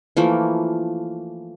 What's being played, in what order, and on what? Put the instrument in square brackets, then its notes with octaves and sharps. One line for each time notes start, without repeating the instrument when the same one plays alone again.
[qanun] E3 F3 A3 A#3